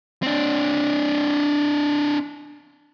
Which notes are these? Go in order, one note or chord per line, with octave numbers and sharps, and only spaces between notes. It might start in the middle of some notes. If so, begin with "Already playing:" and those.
C4 D4